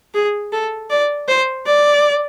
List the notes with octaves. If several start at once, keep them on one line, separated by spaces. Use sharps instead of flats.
G#4
A4
D5
C5
D5